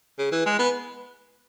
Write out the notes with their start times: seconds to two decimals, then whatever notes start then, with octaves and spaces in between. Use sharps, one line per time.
0.18 C#3
0.32 E3
0.46 G#3
0.59 B3